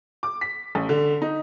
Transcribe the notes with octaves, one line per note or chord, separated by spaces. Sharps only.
D6
B6
A1
D3
D#4